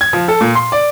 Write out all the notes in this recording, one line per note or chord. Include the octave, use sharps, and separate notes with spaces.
G#6
F3
A4
A#2
C6
D5